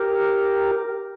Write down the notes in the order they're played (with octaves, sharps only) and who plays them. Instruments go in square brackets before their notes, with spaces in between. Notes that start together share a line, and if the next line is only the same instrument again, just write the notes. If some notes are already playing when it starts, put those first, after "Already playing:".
Already playing: [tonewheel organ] G4 A#4